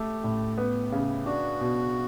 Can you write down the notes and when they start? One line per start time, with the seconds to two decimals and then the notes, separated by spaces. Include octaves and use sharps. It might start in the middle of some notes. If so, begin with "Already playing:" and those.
Already playing: A3 G4
0.24 A2
0.57 B3 G4
0.92 C#3
1.26 D4 F#4
1.61 B2